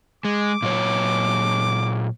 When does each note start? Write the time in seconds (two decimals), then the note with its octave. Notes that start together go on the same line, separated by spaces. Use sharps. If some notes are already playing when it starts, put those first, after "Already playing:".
0.25 G#3 D6
0.62 A#2 F#3 C#5